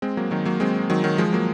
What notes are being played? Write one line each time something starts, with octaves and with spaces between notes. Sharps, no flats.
G#3 C4
F#3 A#3
D#3 F#3
F#3 A#3
G#3 C4
D#3 F#3
D#3 F#3
F3 G#3
F#3 A#3